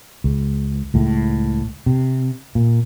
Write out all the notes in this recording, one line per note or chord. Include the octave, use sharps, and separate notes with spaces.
C#2
C#2 A2
C3
A#2